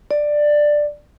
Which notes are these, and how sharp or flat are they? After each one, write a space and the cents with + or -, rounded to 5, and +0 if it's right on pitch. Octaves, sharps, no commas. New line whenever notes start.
D5 +10